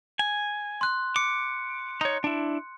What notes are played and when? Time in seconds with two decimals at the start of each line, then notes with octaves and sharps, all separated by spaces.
0.19 G#5
0.81 C6 F#6
1.16 D6 C#7
2.01 D#4 C#5
2.24 D4 E4